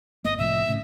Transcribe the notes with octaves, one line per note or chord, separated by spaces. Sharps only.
G1 A#3 D#5
C2 A2 F3 E5
A2 C#3